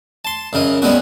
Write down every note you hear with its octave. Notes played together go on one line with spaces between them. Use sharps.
A5 C6
F#2 C#3 A#4 D#5
G3 G#3 B3 C#4 F#4